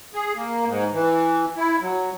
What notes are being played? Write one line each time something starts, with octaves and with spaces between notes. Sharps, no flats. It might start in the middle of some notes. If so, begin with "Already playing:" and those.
G#4
A#3
G#2
E3
E4
F#3